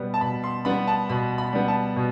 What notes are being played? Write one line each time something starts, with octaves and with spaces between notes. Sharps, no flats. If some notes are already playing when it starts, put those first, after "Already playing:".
Already playing: B2 G3 B3 B5
A5
B2 B5
C6
G3 B3 B5
A5
B2 B5
B5
G3 B3
A5
B2